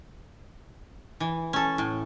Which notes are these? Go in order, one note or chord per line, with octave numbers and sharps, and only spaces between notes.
E3
C#4 A4
A2